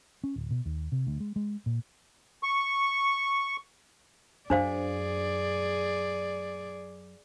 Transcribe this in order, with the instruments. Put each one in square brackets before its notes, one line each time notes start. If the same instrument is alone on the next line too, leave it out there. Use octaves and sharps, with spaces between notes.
[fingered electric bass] C#4
D1
B2
D#2
C3
D2
G#3
G#3
A#2
[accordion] C#6
[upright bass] F#2 [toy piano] D4 C5 F5 [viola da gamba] G#4 D5